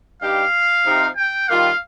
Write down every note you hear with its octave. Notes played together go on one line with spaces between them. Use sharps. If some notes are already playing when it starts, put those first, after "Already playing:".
G2 G3 D#4 G4 F5
C3 F3 D#4
G5
D#3 G3 A#3 F4 F5